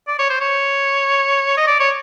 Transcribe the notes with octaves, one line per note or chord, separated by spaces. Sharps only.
D5
C#5
C5
C#5
D#5
D5
C#5